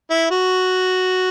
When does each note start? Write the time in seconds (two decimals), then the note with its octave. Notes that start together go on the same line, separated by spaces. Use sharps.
0.10 E4
0.31 F#4